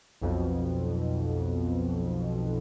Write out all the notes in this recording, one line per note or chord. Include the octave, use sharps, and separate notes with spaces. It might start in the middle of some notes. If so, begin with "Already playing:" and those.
B1 F2 B2